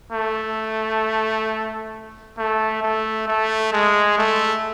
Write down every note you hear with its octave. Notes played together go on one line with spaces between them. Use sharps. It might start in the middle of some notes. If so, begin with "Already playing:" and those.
A3
A3
A3
A3
G#3
A3